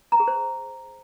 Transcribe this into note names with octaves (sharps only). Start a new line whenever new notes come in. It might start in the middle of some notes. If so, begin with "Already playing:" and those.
A#5
G#4
C5